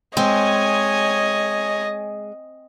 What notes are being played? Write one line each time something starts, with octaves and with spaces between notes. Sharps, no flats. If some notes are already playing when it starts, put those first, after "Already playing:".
G#3 C4 C#5 D#5 G#5